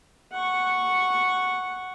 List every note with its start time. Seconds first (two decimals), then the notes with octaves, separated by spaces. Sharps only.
0.32 F#5 C#6